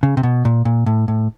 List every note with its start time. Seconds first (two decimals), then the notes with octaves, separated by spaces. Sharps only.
0.03 C#3
0.17 C3
0.23 B2
0.45 A#2
0.65 A#2
0.86 A2
1.08 A2